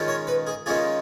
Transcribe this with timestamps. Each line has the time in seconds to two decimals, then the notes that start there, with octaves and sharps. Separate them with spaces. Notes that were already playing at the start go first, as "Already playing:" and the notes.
Already playing: D#3 G#3 C#4 F4
0.08 C#5
0.27 B4
0.47 G#4
0.66 D#3 G#3 C#4 F4 G#4